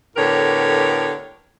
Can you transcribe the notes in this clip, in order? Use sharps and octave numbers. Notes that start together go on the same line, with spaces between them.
A2 D3 B3 G4 A#4 C#5